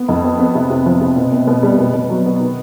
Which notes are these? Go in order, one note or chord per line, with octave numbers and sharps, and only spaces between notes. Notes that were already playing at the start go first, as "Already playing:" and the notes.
Already playing: B3
F2
B3
B3
C3
C3
F3
C3
B2
B2
B2
G3
B2
B2
F#3
B3
D#3